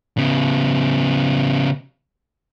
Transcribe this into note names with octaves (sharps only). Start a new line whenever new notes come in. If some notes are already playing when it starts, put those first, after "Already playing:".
C#3 B3